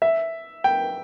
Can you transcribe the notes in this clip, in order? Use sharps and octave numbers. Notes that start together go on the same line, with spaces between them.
E5
G5